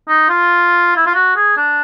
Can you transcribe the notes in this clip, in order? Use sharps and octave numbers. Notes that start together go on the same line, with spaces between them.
D#4
F4
E4
F4
F#4
G#4
D4